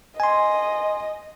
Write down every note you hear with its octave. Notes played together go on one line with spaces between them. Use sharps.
D#5 G#5 C6